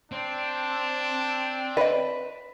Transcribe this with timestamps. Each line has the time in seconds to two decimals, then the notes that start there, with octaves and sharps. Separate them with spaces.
0.12 C4 D4
1.77 B4 D5 D#5